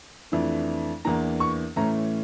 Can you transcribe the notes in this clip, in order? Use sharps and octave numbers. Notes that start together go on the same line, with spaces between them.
F2 E3 A3 D4
E2 E3 A#3 D4 A#5
C#6
A2 E3 A3 C#4 A#5